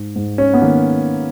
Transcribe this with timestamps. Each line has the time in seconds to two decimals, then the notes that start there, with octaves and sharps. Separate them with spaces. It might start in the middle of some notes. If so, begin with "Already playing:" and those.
Already playing: G#2
0.16 G#2
0.38 C#4
0.54 B3
0.61 D#3 A#3